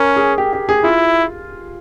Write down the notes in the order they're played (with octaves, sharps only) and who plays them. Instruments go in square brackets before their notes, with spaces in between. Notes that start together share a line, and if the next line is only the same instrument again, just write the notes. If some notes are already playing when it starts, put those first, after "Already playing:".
Already playing: [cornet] C#4 [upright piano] A#4
[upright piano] G#4
G4
G4
G#4
[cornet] E4 [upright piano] F4